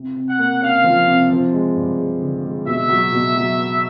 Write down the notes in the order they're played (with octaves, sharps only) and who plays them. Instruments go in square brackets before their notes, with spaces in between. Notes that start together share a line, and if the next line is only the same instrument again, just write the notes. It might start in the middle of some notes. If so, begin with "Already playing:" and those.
Already playing: [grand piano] C3
C3
[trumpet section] F#5
[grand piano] A#3
[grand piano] C#4 [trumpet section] F5
[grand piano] F3
C3
F3
G#3
G2
G#3
D3
G#3
[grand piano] B2 [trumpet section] E5
[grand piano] F#3
B2
F#3
B3